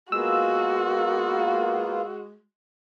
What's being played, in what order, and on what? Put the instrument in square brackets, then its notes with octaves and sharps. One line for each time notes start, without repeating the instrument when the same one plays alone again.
[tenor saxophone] G#3 [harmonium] A#3 B3 F4 [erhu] F#4 [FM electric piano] E6